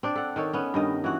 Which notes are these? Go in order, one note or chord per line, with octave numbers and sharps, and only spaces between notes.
C4 D4 D5
A4 F#5
D#3 A4 C#5
B3 C#4
G2 D#3 D#5
E3 F#4